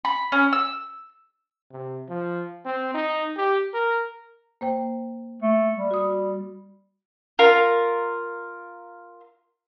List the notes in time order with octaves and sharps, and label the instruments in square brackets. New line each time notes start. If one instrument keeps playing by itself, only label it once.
[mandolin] B5
C#4
E6
[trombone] C3
F3
C4
D#4
G4
A#4
[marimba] A#3 C5 G5
[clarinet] A3
G3
[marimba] F#4 D#6
[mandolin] F4 A#4